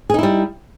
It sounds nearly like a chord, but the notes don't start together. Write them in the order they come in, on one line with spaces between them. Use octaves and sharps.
G#4 D#4 E4 G3